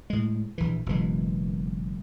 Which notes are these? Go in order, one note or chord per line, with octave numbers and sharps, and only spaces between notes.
A2 G#3
A#1 E3
F#1 B2 E3 G#3